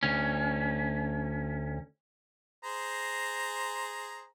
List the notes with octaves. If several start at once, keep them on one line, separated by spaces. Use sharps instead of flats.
D2 C#4
G#4 C5 A#5